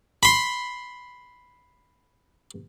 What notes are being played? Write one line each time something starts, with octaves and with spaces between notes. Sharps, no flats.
B5 C6